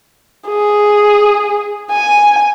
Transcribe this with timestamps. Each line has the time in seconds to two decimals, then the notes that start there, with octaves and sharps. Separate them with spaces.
0.49 G#4
1.91 G#5